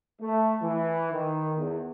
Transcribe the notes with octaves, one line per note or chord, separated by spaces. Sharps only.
A3
E3
D#3
E2